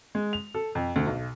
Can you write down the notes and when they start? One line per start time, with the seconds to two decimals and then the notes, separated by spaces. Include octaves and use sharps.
0.15 G#3
0.33 F7
0.55 A4
0.75 F2
0.96 D2
1.07 B1